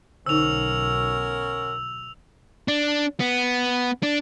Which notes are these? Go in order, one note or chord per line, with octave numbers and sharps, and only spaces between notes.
B1 D3 C#4 D#4 F#4 A#4 E6 F7
D4
B3
D4